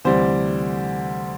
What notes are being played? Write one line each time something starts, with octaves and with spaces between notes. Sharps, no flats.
D2 C3 E3 G3 C5